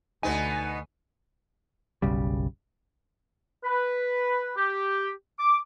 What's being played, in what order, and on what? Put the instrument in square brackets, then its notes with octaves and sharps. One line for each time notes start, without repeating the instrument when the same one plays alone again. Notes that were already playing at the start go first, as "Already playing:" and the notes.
[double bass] D2 [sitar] B2 B3 D#4 [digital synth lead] G#5
[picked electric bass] F#1 B1 C#3 G3
[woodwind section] B4
G4
D6